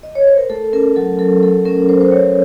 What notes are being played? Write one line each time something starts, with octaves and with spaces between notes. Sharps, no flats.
D#5
C#5
C5
A#4
A3 A4
C#4 A#4
F#3 A4
F#3 A4
A3 A4
C#4 A#4
F#3 C5
C5
F#3 C#5